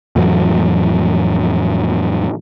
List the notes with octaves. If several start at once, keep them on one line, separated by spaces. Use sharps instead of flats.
F2 A2 E3 F#3